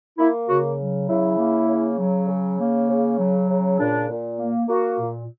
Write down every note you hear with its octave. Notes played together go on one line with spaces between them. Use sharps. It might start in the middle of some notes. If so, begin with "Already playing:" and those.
A#3 E4
C#3 F#4
F#3
C#3 E4
A#3
C#3
F#3
C#3
A#3
C#3
F#3
C#3
A#2 D4
A#2
A#3
A#3 F#4
A#2